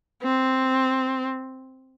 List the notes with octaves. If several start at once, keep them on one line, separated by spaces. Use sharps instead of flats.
C4